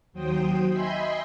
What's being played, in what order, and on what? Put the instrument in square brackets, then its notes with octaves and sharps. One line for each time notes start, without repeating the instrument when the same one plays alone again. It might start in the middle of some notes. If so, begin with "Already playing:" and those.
[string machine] D#2 F#3 C5 G5 D#6
D#5 E5 G5 G#5 B5 C6